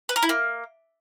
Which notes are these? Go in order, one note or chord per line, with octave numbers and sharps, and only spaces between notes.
B4
A#4
E4
A#3